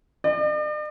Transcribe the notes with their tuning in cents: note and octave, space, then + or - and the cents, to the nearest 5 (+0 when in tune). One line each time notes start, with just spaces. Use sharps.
D5 +45